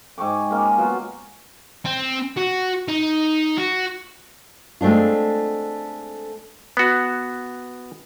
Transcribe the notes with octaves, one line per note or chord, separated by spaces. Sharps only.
G#2 G5 C#6 D6
G#3 A#3 C#4
F#3 B3 F4
C4
F#4
D#4
F#4
G#3 A3 C4 D4 F4
B3 F#4